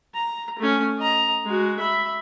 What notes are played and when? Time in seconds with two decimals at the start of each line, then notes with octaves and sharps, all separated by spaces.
0.14 A#5
0.59 A3 C#4
0.98 D#5 A#5
1.45 G#3 F#4
1.79 E5 B5